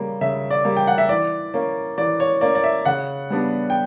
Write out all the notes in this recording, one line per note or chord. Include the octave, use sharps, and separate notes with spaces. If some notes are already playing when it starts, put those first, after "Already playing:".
Already playing: C#3 G3 A#3
C#3 E5
D5
G3 A#3
G5
F#5
E5
E3 D5
A#3 C#4
E3 D5
C#5
A#3 C#4 D5
D5
E5
C#3 F#5
G3 B3 D4
G5